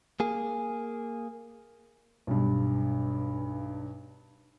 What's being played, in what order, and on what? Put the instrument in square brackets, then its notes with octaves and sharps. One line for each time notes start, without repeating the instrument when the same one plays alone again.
[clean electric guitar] A#3 G#4
[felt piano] B1 G2